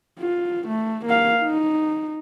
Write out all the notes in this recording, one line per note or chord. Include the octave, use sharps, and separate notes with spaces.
F4
A3
A#3 F5
D#4